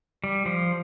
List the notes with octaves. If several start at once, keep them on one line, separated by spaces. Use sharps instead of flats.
G3
F3